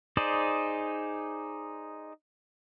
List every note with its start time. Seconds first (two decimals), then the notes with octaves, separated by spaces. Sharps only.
0.17 D#4 G#4 C5 D5